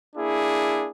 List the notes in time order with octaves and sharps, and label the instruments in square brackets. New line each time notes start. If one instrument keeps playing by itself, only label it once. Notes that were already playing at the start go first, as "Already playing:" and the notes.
[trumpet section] A#3 D4 E4 G#4